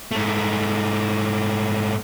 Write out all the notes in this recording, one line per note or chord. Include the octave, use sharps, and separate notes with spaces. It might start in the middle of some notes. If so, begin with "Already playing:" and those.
G#2 A3